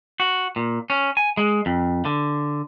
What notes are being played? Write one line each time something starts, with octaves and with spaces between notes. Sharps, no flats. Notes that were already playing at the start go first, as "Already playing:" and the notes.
F#4
A#2
C#4
G#5
G#3
F2
D3